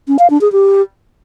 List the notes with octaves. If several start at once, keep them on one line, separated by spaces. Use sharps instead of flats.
C#4
F5
D4
G#4
G4